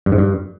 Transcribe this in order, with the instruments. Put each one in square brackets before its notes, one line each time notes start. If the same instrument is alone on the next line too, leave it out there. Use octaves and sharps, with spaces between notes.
[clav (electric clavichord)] G2
G#2
G2